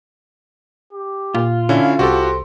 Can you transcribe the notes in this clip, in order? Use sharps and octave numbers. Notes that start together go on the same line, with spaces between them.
G4
A#2 F4
D3 C#4 E4 F5
C2 F#4 G4 A4 C5